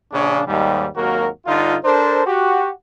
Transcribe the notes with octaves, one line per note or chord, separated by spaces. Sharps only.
A#1 C#3 D4
D#2 G#2 G3
G#1 D#2 F#3 A#3 F#4 A#4
G2 D3 D#4 F4
D4 A4 A#4 C5
F#4 G4